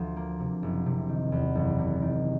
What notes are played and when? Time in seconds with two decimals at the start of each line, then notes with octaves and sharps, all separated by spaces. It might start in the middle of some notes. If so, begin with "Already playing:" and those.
Already playing: D2 F3
0.16 A#3
0.40 C3
0.63 F#1
0.86 C3
1.09 D#3
1.32 E2
1.55 F#1
1.79 C3
2.02 D#3